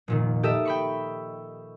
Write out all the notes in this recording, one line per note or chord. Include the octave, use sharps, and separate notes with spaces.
F1 A#2 D#3
G4 A4 A#4 D#5 E5
G5 B5 C#6